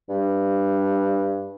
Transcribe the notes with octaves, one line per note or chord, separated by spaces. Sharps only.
G2